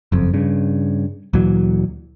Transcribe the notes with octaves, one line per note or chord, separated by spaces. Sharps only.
F#1 F2
G2 C#3
D2 A#2 E3 F#3